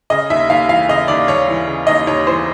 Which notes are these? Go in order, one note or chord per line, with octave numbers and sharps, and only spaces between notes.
C#3 D#5
D#2 E5
D#2 F5
E3 F5
C#3 D#5
D#2 D5
D#2 C#5
E3
C#3
D#2 D#5
D#2 C#5
E3 C5